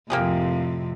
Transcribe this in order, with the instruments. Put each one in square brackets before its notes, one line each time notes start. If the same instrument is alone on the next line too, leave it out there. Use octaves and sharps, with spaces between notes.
[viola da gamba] F2 A2 C3 [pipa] A#3 G4 G#4